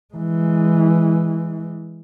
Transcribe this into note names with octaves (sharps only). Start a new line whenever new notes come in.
E3 G#3